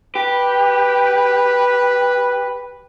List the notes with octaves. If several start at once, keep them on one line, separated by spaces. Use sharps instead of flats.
G4 B4